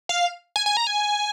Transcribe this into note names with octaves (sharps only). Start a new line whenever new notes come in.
F5
G#5
G#5
A#5
G#5